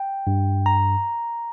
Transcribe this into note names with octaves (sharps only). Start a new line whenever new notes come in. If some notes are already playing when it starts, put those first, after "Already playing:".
Already playing: G5
G2
A#5